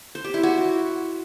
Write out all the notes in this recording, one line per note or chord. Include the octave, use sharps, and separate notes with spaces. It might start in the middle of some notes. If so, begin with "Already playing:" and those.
C5
G4
E4
F#4